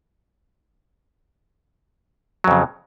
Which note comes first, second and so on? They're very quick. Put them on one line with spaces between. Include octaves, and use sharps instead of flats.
F#3 F2 C#3